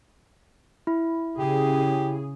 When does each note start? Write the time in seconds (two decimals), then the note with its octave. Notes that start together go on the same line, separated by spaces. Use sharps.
0.87 E4
1.38 C#3 G4 G#4